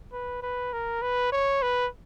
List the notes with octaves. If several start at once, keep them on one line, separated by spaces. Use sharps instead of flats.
B4
B4
A#4
B4
C#5
B4